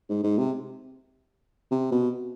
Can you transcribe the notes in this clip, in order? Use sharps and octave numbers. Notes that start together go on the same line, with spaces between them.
G#2
G#2
C3
C3
B2